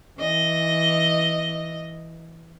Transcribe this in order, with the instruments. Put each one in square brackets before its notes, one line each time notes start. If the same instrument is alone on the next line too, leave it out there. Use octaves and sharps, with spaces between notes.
[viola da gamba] E3 D#5